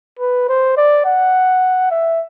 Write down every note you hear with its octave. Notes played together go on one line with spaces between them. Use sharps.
B4
C5
D5
F#5
E5